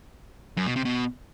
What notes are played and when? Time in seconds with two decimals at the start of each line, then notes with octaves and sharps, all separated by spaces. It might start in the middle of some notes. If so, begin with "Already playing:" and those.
0.57 F#2
0.66 B2
0.76 C3
0.85 B2